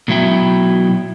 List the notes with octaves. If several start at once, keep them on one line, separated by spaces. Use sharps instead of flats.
B2 F#3 E4 G5